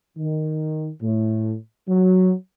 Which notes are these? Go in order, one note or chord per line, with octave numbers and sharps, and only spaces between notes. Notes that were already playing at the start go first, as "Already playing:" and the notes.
D#3
A2
F#3